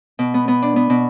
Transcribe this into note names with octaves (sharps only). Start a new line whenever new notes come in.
B2
B3
B3
D4
B3
B2